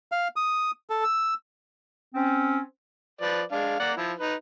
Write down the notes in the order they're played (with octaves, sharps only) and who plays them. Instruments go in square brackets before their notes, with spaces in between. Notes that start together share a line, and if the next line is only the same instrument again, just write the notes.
[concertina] F5
D#6
A4
E6
[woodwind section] C4 C#4
[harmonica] F3 B4 D5
G#3 D4 F5
A#3 D5 F#5
F3 E4
D#4 B4